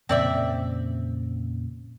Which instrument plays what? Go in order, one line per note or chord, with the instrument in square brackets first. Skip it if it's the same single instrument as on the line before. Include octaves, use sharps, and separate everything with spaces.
[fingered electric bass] F2 A#2 C#3 [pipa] C4 D5 E5